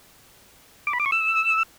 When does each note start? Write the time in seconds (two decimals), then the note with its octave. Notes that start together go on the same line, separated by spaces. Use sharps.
0.87 D6
0.93 B5
1.00 D6
1.06 C#6
1.12 E6